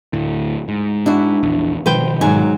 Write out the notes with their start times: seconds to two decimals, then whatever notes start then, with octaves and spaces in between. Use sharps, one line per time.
0.13 D2 A2
0.68 G#2
1.06 D4 E4 F#4
1.43 A#1 E2
1.86 B2 D#3 F3 B4 C5 G5
2.21 G#2 F#3 G#5